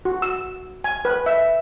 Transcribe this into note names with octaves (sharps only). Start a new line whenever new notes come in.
F#4
E6
G#5
B4
E5